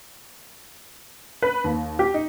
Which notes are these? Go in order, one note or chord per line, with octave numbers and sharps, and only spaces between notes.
B4
D#2
G4
D#4